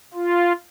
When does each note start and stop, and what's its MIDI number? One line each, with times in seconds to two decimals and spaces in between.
0.14 0.52 65